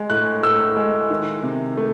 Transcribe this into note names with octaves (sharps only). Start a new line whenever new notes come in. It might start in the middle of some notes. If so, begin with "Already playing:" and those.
Already playing: G#3
A2 F#6
A2 E6
G#3
D#3
C3
A3